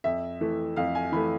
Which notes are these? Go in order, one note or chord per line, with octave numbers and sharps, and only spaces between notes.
F2 E5
E3 A3
F2 F5
G#5
E3 A3 B5